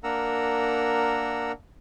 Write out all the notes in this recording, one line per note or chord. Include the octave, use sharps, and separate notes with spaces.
A#3 D4 A#4 F#5 A#5 E6